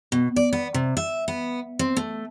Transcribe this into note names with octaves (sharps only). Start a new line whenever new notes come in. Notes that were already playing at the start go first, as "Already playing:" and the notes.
B2
D5
B3
C3
E5
B3
C4
A3